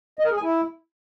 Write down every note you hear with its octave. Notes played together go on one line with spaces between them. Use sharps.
D#5
A#4
G#4
G#5
E4